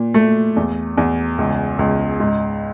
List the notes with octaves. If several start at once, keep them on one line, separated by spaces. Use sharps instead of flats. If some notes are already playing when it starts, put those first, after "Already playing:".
Already playing: A#2
A3
E2
E2
C#2
C#2
G#2